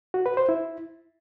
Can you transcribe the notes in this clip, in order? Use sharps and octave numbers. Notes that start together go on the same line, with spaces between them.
F#4
B4
C5
E4